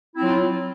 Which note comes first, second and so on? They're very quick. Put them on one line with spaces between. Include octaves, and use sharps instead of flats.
E4 C4 F#3 F4